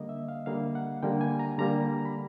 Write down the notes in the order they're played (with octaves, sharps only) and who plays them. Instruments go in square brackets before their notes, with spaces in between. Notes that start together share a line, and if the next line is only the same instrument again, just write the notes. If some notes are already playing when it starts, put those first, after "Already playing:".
Already playing: [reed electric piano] D3 G3 A#3 D#5
E5
F5
D3 G3 A#3 F5
F#5
D3 G3 A#3 G5
G#5
A#5
D3 G3 A#3 A#5
B5